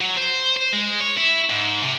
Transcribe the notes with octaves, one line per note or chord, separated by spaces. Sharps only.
F#3
C5
C5
G#3
C#5
E4
G#2
C3